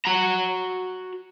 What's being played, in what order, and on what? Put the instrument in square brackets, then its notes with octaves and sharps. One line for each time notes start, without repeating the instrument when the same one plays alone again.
[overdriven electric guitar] F#4 A#5